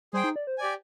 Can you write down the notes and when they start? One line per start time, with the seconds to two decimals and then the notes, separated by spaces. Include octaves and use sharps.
0.13 G3 G#4 C5 G5
0.24 D#4
0.36 D5
0.47 C5
0.58 G4 D5 G#5